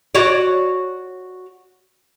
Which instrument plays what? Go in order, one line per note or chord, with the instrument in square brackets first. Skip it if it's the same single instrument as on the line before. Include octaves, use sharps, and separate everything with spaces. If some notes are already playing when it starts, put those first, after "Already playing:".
[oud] F#4 C#5 D5